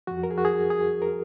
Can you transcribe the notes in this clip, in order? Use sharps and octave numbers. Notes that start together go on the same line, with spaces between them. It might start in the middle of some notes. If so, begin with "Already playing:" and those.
F2 F3 F#4
A#4
G#4
F#4
G#4
G#4
A#4